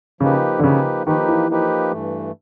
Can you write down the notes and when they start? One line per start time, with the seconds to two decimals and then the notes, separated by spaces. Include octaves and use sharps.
0.20 C#3 F3 A#3 D#4 G4 B4
0.59 D3
0.64 C#3 F3 A#3 D#4 G4 B4
1.06 D#3 F3 A#3 D#4 G4 B4
1.28 E3
1.49 F3 A#3 D#4 G4 B4
1.91 G2 E3 A3